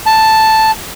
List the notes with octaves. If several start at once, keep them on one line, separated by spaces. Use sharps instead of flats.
A5